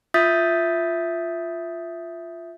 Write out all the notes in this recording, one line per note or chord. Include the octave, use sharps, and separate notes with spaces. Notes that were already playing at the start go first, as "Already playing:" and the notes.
F4 E5 D#6 G6 A6 B6